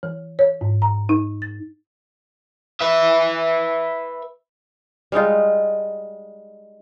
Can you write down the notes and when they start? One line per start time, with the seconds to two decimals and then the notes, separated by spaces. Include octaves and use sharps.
0.03 E3
0.39 C#5
0.61 G#2
0.82 A#5
1.09 D#4
1.42 A6
2.81 B4 E5
5.12 G3 G#3 D#4 F4